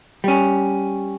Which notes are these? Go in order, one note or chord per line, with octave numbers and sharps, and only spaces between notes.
G3 C#4